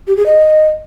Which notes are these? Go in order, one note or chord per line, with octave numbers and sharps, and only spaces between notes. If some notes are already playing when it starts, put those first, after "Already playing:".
G4
G#4
D#5